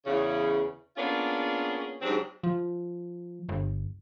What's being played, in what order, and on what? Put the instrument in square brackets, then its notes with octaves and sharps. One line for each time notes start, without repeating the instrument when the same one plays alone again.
[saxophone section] E2 C#3
A#3 B3 C#4 D4 F4 G#4
G#2 C#3 F#3 G3 C4 D4
[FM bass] F3
G1